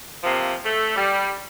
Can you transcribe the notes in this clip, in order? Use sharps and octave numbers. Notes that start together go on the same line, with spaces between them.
C3 F3 A#3
A3
G3